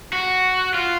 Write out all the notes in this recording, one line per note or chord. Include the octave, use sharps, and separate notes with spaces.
F#4
F4